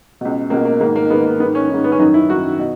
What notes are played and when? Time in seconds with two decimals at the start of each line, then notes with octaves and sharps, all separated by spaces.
0.21 C#2 B2
0.50 C#2 B2 A#3
0.65 A#3
0.80 G#2 D#3 A#3
0.96 A#3
1.10 G#2 D#3 B3
1.25 A#3
1.39 G#2 D#3 B3
1.55 C#4
1.70 G#2 D#3
1.84 B3
1.92 C#4
1.99 F#2 D#3 D#4
2.14 E4
2.29 F#2 D#3 F#4
2.59 B2